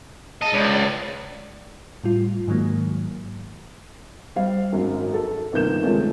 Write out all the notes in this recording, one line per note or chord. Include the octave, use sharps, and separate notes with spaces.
G#4 D#5 A5
C#2 C#5 D5
A2 G3 F4
G#2 D#3 F#3 G#3 A#3
G3 C5 F5
G#1 F#2
A4
G1 C3 D#3 A#3 G6 E7
C3 D#3 F3 G#3 A3 C#4